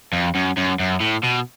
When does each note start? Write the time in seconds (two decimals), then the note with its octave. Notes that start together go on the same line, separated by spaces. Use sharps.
0.13 F2
0.35 F#2
0.57 F#2
0.79 F#2
1.01 A2
1.24 B2